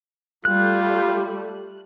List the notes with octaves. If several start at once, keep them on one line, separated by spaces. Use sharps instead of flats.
G3 A3 F4 F#6